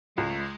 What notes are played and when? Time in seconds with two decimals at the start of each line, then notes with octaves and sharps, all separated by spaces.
0.17 C#2 G#3
0.29 A3
0.40 G#3